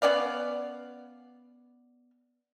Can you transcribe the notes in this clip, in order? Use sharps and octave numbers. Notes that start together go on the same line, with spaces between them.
B3 C#4 D5 F5